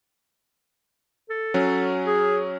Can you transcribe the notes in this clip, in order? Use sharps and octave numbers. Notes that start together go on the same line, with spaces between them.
A4
F#3 C#4
G#4